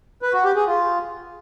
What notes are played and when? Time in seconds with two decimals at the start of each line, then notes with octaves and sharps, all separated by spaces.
0.22 B4
0.33 F#4
0.45 G4
0.56 G#4
0.67 F4